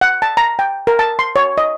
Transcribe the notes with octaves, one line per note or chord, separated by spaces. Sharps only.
F#5
A5
A#5
G5
A#4
A5
C6
C#5
D#5